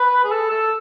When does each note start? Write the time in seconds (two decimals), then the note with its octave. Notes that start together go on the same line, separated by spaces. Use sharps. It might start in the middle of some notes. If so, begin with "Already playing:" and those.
Already playing: B4
0.24 G#4
0.31 A4
0.51 A4